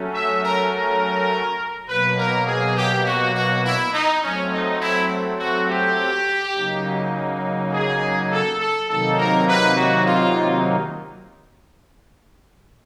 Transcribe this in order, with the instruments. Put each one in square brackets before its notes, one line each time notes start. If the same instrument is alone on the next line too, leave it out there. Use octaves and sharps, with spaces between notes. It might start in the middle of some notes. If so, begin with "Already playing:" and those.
Already playing: [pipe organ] F#3 A3 C#4
[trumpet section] E5
A#4
A#4
[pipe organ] B2 F#3 A#3 [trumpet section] B4
[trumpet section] A#4
G#4
G4
F#4
F#4
E4
D#4
[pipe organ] F#3 A3 C4 [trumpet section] C#4
[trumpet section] D#4
E4
F#4
G4
[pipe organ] C#3 F#3 A#3 D#4
[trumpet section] G#4
A4
A4
[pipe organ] C3 D#3 F#3 A#3 D#4 [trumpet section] A4
[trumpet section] A#4
B4
F#4
F4